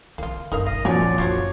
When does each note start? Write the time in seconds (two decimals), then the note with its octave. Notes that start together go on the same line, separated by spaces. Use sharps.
0.18 D3 E3 A#3 F4
0.52 G1 D#4 A#4 F5
0.66 B2 D#5 F5
0.85 A#2 F3 F#3 C#5 D5 F#5 G#5
1.00 F2 D#3
1.18 F#1 D4 F4 C5 C#5